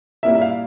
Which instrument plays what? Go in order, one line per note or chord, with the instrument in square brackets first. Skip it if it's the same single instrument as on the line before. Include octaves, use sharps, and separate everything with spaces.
[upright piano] A#2 G3 A#3 E4 A#4 [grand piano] E5
[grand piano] E5
F5